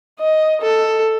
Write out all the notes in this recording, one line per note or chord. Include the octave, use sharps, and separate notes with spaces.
D#5
A4